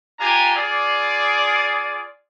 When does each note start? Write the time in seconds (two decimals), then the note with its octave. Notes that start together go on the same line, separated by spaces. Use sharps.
0.20 D4 F4 G4 G#5 A#5
0.56 F4 G#4 D5